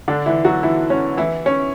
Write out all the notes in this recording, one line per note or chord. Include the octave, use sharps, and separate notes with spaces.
D3 D4
E3 E4
F#3 F#4
E3 E4
C#4
E3 E4
C#4